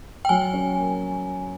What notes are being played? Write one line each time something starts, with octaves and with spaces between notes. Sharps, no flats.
G5
F#3 G#5
C#4
A#3